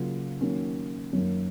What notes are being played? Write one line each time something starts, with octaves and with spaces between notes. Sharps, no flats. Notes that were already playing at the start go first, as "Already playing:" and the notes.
Already playing: C#3 F#3 A#3 F4
D#3 F#3 A#3 C#4
F#2 D#3 F#3 A#3